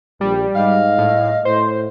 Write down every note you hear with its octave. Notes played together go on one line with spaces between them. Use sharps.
A#1 G3
G#2 D#5 F5
A2
A2 C5